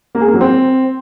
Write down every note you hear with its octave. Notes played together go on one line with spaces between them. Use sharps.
A#3
G#4
A#3
F#3
C4